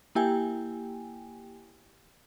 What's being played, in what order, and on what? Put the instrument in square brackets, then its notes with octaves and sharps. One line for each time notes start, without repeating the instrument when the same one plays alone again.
[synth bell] A#3 E4 G4 G5 G#5